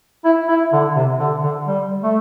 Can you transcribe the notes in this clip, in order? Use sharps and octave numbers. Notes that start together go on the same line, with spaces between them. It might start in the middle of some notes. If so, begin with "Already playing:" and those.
E4
E4
D3
C3
D3
D3
G3
A3